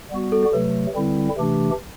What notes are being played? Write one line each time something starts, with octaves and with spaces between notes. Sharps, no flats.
G3 B3 F#4
A4
A4
C3 F#3 A3 B4
D3 G3 C4 E4
C3 E3 A3 D4 G4